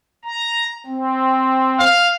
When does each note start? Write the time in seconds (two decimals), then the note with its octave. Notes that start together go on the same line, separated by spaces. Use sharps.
0.24 A#5
0.86 C4
1.79 F5